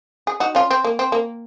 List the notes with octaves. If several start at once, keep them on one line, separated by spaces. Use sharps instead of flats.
G#4
D#4 F#4
C#4 F4
C4
A#3
C4
A#3